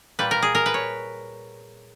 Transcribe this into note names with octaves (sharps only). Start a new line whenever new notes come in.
A#2 G3 B4
A#4
G#4
A#4
B4
C#5